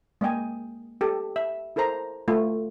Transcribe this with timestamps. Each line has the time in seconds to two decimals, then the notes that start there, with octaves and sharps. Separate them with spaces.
0.21 G#3 A#3 D#5 G5 G#5
1.01 G4 A4
1.36 E5
1.76 E4 A4 A#4 C5 A#5
2.28 A3 F4